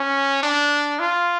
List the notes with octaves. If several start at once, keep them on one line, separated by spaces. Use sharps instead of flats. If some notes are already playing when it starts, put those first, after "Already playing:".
Already playing: C#4
D4
F4